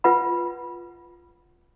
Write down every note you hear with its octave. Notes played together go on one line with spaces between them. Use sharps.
F4 B4 F#5 B5